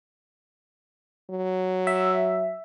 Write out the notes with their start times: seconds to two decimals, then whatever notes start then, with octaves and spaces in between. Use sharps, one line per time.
1.30 F#3
1.87 E5